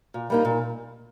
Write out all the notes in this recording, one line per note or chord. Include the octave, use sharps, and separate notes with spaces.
A#2
G3 A#3 D#4
A#2